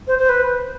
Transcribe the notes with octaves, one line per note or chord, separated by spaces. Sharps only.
C5
C5
B4